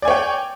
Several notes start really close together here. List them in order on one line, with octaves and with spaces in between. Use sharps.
D5 G#5 C#5 G5